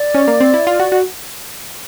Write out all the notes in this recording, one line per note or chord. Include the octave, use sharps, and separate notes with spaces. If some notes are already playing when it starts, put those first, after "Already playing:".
Already playing: D5
C#4
A#3
C4
E4
F4
F#4
F#4